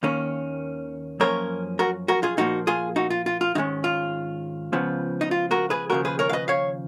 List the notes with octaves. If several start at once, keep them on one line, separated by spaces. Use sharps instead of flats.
D#2 D#3 A#3 C#4
F#2 F3 A#3 C#4 A#4 C#5
F#4 A#4
F#4 A#4
F4 G#4
A#2 F3 A#3 D#4 F#4
F4 G#4
D#4 F#4
F4
F4
F4
G#2 D#3 G#3 C#4 D#4
F4
C#2 C#3 F3 B3
D#4
F4
F#4 A#4
G#4 B4
D#2 C#3 F3 F#4 A#4
G#4 B4
A#4 C#5
F5
B4 D#5
C#5 F5